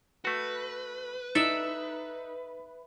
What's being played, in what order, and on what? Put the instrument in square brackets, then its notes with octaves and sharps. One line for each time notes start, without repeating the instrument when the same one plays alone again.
[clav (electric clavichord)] A3 F#4 [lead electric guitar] B4
[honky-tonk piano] D#4 [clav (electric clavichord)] A4 D5 [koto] E5